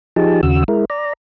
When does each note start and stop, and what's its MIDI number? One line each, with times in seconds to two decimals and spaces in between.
0.16 0.41 53
0.16 0.41 63
0.16 0.41 67
0.16 0.41 68
0.16 0.41 81
0.43 0.64 39
0.43 0.64 49
0.43 0.64 66
0.43 0.64 88
0.68 0.85 56
0.68 0.85 64
0.68 0.85 70
0.90 1.13 74
0.90 1.13 82